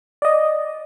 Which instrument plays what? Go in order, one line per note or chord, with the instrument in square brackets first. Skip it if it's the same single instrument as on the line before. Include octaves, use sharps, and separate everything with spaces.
[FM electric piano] D5 D#5